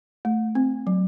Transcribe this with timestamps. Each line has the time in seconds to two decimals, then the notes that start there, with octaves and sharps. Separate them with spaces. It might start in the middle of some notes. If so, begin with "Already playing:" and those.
0.25 A3
0.55 C4
0.87 F#3